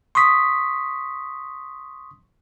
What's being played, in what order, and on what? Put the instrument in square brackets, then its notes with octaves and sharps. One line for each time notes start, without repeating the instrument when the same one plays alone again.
[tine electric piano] C6 C#6 D#6 B6